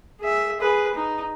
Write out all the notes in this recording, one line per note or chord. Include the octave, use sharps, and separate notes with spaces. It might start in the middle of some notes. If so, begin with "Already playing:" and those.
G#4 E5
G#4 B4
D#4